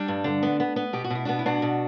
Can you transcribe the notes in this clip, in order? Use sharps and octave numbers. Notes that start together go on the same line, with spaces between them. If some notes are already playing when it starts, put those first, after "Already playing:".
Already playing: G3 D4
G2
D3
B3
B3
B3
B2 G4
F#4
B2 E4
B3 D4 F#4
E4
B2 D4 F#4
B2